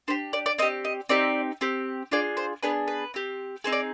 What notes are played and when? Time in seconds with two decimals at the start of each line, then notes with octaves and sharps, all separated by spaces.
0.08 D4 G4 C5
0.33 D5
0.46 D5
0.58 C4 D#5
0.62 G4
0.85 D#5
1.09 C4 D#4 G4 D5
1.61 C4 G4
2.12 D4 F4 G#4 D5
2.37 C5
2.63 B3 D4 G#4 B4
2.88 B4
3.14 C4 G4
3.64 C4 D#4 G#4 C5
3.72 D5